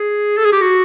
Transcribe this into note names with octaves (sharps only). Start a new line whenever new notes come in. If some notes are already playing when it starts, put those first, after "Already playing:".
Already playing: G#4
A4
G#4
G4
F#4